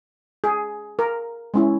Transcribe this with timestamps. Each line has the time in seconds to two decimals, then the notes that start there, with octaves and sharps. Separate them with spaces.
0.44 G#4
0.99 A#4
1.54 G#3 C#4 E4